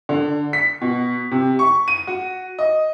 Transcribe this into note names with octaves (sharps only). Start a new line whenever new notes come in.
D3
B6
B2
C3
C#6
D#7
F#4
D#5